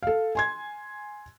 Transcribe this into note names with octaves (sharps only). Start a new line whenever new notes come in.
A4 F5
G#5 C6 G#6